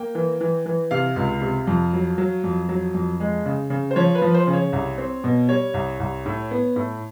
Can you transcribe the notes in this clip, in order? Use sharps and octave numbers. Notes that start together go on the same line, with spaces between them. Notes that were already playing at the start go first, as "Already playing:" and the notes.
Already playing: A#3 G5
E3
E3
E3
C3 F5
C#2
C3
F2
F#3
F#3
F2
F#3
F2
G#3
C#3
C#3
C5
F3 C#5
B4
F3
C5
C#3
C#5
C2
C4
B2
G3 C#5
C2
C2
A2
B3
A2